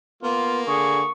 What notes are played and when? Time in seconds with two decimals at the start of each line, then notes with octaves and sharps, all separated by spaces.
0.23 A#3 B3 F4
0.67 D3 G#4 C#6